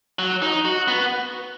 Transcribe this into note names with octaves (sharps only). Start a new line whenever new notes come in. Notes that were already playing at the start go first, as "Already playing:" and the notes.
F#3
D#4
F#4
B3